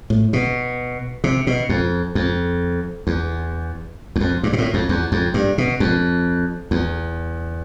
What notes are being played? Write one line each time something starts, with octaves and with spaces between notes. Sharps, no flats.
A2
B2
C3
B2
F2
F2
E2
E2
F2
G2
B2
A2
F2
E2
F2
G2
B2
F2
E2